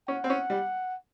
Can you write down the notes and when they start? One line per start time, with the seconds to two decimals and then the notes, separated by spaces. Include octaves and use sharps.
0.08 C#4 F#5
0.24 C4
0.30 C#4
0.50 G3